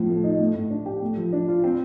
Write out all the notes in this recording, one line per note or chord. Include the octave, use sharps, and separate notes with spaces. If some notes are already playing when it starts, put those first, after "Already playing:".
Already playing: A2 F3
A3
D#4
A3
A2
D4
G4
A3
F3
D4
F4
C4